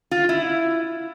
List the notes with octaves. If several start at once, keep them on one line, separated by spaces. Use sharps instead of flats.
F4
E4